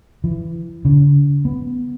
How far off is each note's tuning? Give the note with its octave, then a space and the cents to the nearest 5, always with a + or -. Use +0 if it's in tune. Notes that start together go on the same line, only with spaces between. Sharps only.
E3 +20
D3 -45
B3 +5